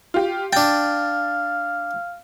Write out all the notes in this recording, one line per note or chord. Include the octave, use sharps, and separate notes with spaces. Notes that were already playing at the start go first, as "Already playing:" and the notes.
F4 G4
D4 F5 G5 A6